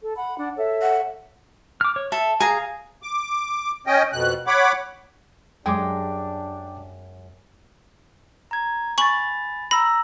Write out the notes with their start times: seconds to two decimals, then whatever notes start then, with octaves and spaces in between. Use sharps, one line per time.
0.03 A4
0.16 F#5 B5
0.37 D4 F#5
0.56 A4 C#5 E5
0.82 F#5
1.81 D6 F6
1.96 C#5
2.12 A4 E5
2.40 G#4 F5 G#5 A#5
3.03 D6
3.87 C#4 D#5 G5
4.13 F2 B2 F#6
4.47 C#5 F#5 B5 D6
5.66 F#2 G3 G#3 D4 G#4 G5 D6
8.51 A#5 G#6
8.98 G#5 B5 C#6 A6 F#7
9.71 A#5 B5 E6 A#6